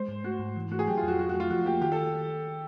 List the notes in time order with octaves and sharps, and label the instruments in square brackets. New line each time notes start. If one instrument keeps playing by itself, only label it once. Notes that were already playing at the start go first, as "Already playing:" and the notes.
Already playing: [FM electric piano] G#3 [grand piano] C5
[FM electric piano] G#2
[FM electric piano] A3 [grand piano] F#4
[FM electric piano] G#2
E3
[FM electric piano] A3 [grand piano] F#4
[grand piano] G#4
[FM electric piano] F#3 [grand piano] G4
[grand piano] F4
[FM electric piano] F2 [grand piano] F#4
[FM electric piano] F#3 [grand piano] F#4
[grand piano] F#4
[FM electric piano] A3
[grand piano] F4
[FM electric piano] F3 [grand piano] F#4
[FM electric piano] A#3 [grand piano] G4
[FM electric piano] D#3 [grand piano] G4
[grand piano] A4